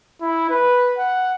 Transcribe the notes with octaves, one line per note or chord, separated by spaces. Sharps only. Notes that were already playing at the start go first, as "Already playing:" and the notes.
E4
B4
F#5